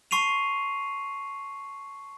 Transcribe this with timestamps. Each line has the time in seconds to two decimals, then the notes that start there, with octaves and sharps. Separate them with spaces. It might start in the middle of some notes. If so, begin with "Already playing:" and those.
0.11 A5 C6 C#6 C7 D#7 F7